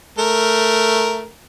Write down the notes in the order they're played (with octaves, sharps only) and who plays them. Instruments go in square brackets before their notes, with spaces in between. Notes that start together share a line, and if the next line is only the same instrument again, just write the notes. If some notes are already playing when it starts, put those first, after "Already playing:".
[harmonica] A3 A#4